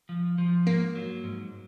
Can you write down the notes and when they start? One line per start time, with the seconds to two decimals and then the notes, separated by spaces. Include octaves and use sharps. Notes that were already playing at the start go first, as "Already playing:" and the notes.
0.09 F3
0.38 F3
0.66 G#2 A#3
0.95 F#3
1.24 G#2